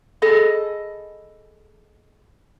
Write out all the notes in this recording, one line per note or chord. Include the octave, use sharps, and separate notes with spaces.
G#4 A4 D#5 B5